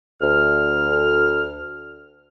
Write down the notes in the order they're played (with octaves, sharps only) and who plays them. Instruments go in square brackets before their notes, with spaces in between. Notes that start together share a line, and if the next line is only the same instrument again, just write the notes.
[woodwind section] D2 F6